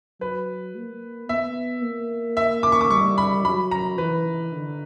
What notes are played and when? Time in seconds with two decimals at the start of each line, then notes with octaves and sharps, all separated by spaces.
0.21 F#3 B4
0.75 A#3
1.29 B3 E5
1.83 A#3
2.37 E5
2.63 D6
2.72 C#6
2.81 D6
2.90 G3 C#6
3.18 B5
3.44 F#3 B5
3.71 A#5
3.98 E3 B4
4.52 D3